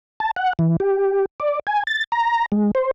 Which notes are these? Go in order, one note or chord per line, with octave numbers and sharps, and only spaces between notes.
A5
F#5
E3
G4
D5
G#5
A6
A#5
G#3
C5